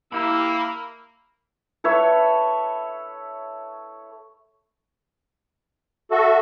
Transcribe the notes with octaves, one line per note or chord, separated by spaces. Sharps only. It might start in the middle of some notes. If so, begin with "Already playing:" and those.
A#3 E4 G4 B5 E6
A4 B4 C#5 E5
F#4 A4 E5